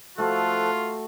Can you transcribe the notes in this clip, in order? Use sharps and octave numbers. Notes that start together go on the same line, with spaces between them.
F3 A3 F4 F#4 A4 F#6